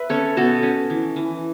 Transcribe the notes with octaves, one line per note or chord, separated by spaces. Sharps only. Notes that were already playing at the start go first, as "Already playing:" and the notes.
Already playing: B4 E5
C#4 A4 C#5
B2 F#4 A4
C#4
E3
E3